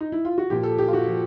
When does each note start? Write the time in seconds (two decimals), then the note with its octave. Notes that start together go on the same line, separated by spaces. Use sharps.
0.01 D#4
0.12 E4
0.25 F4
0.38 F#4
0.50 A#2 F3 G4
0.63 A4
0.78 G4
0.88 F4
0.93 F#4
1.07 F3